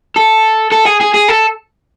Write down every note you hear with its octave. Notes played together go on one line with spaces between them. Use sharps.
A4
A4
G#4
G#4
G#4
A4